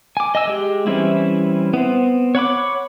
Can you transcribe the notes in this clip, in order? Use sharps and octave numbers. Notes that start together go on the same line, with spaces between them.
G#5 D6
D#5 G#5 E6
G#3 G4
E3 G3 C4 C#4 E4
B3 C4
C#5 F#5 B5 D6